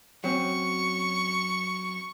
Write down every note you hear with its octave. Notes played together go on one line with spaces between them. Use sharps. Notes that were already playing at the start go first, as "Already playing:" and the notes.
F#3 C4 C#4 C#6